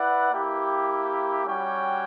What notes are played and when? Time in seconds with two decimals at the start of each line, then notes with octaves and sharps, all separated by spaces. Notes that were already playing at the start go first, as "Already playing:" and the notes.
Already playing: E4 B4 D5 F#5
0.31 A#3 E4 G4
1.47 G3 C#4 F#4 C#5 G5